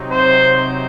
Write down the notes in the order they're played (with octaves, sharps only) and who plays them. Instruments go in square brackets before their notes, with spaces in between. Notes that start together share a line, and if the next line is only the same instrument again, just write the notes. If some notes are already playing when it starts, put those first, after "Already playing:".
Already playing: [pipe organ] C3 F#3 C4 D#4
[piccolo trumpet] C5